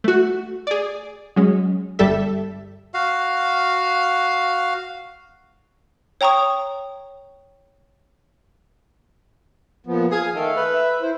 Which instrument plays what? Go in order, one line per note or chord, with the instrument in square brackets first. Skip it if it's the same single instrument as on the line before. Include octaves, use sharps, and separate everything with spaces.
[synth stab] A3 F#4
G#4 D5
F#3 G#3 C#4
G1 G3 A4 E5
[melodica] F#4 F5
[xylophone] C#5 G5 A#5 C#6 D#6
[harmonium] A#2 F3 B3
[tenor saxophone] G#4 [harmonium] F5 G#5
[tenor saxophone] D#3 [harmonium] A3 A4 F5
[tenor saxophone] B4
[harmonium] E5
E4 C5